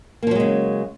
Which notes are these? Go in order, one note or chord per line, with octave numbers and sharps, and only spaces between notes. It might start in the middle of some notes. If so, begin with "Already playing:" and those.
C#3 F3 F#3 G#3 A#3